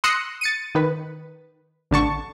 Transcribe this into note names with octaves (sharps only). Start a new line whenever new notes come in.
C6 D#6 E6 F#6 A#6 C#7
A6 C#7 D#7
D#3 B4
A1 D3 A5 C#6